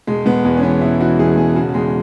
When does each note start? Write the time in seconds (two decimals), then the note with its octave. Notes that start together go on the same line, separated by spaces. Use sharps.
0.07 E1 G#3
0.26 E1 B3
0.45 E2 G#3
0.57 C#4
0.63 E3 B3
0.81 E1 E4
1.00 E3 F#4
1.19 E2 G#4
1.37 E1 G#4
1.56 C#3 F#4
1.74 E2 G#3